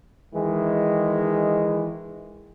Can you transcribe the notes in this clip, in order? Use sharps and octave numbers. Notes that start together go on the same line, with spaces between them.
D#3 E3 G#3